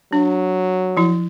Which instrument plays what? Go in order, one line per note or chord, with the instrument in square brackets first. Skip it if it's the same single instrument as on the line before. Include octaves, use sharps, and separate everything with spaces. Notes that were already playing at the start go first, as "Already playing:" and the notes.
[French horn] F#3 [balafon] D4
[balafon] F3 E4